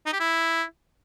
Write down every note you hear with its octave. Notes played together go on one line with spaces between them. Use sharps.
D#4
G4
E4